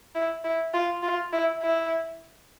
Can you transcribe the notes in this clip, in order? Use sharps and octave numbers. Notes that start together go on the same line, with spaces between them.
E4
E4
F4
F4
E4
E4